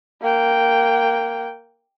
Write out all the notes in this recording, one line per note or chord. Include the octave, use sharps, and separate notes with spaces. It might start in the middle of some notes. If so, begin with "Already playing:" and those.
A#3 G5